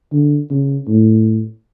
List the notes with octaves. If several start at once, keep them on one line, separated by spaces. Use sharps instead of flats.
D3
C#3
A2